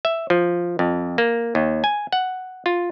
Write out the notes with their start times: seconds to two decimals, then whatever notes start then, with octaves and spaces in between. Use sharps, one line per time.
0.05 E5
0.30 F3
0.79 F2
1.18 A#3
1.55 D#2
1.84 G#5
2.13 F#5
2.66 F4